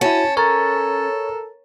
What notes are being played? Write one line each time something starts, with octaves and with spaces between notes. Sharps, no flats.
C#4 E4 F#4 A5
A4 A#4 C#5 A#5 A6